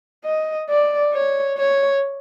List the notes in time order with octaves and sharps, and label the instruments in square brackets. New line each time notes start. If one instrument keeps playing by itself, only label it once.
[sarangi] D#5
D5
C#5
C#5